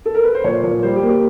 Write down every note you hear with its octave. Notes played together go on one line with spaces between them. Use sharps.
A4
A#4
B4
C5
A#2 C#5
A#2
G3 C5
G4
A#3
G4